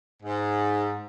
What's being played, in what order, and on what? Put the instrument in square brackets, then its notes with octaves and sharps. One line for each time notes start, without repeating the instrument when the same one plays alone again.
[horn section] G#2